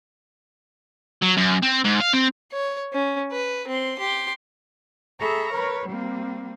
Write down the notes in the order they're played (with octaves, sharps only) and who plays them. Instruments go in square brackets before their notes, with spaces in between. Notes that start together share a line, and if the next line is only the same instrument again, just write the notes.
[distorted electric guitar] F#3
F#2
C4
G#2
F5
C4
[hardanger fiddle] C#5
C#4
B4
C4 C6
G4 C6
[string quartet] G#4 A4 E5 A#5 B5 C#6
A#4 B4 C#5
G3 A#3 C4